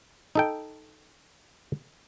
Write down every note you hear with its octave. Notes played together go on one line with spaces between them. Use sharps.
D#4 A4 G5